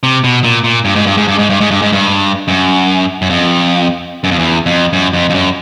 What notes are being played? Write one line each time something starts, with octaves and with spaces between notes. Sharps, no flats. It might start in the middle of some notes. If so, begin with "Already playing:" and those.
C3
B2
A#2
A#2
G2
G#2
G2
G#2
G2
G#2
G2
G#2
G2
G#2
G2
F#2
F#2
F2
F#2
F2
E2
F2
F#2
F2
F2
F#2